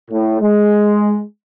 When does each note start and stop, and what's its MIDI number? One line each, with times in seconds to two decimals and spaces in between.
0.11 0.40 45
0.41 1.21 56